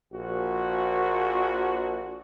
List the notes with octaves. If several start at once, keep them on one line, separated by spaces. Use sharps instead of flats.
A#1 F#4